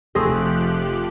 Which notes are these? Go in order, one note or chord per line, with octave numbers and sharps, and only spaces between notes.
F1 F3 A3 C4 G4 G#4 F#6 A#6